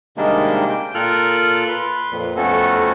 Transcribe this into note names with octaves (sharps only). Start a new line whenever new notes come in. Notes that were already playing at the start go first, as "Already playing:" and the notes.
C3 D#3 G3 G#3 A#3 D4
G5
A#2 F4 A4 A#4 F6 F#6
B4 C6
F2 A#2
F2 A3 B3 C#4 F#4 A4